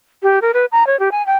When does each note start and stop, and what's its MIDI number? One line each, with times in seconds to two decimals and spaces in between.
0.23 0.39 67
0.42 0.51 70
0.54 0.65 71
0.72 0.86 82
0.87 0.99 73
0.99 1.11 67
1.11 1.25 80
1.26 1.37 79